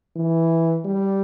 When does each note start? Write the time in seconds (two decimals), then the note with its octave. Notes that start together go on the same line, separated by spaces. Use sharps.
0.16 E3
0.85 G3